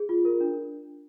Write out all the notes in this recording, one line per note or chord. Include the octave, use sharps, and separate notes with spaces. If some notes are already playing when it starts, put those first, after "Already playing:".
Already playing: G#4
F4
A#4
D4